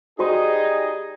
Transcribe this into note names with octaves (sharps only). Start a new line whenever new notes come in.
G3 D#4 F#4 G#4 C5 D#5 C6